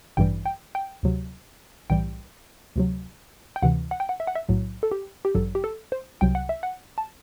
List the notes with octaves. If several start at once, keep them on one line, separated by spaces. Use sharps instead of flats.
A1 G2 E3 G3 G5
G5
G5
D2 C3 F#3
B1 A2 E3 G3 G5
D2 C3 F#3
G5
D2 C3 E3 F#5
F#5
G5
F#5
E5
F#5
E5
B1 A2 F#3
A4
G4
G4
A1 G2 F#3 A4
G4
A4
C5
C2 C3 F#3 G5
F#5
E5
F#5
A5